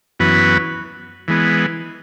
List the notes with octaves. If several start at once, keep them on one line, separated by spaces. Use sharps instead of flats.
F#2 E3 B3 F#4 B4
E3 G#3 B3